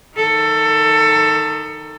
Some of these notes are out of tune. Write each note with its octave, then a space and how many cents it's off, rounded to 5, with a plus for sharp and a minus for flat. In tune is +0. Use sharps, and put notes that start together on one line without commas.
D#3 +0 A4 +20